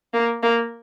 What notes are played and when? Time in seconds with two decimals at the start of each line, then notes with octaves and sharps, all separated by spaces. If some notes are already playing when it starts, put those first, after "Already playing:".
0.14 A#3
0.43 A#3